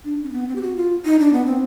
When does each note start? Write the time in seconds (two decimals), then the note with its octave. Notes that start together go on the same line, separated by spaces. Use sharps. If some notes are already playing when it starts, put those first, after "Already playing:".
0.05 D4
0.24 C#4
0.29 C4
0.33 B3
0.48 C4
0.56 G4
0.62 F#4
0.76 F4
1.05 D#4
1.19 D4
1.33 B3
1.45 C4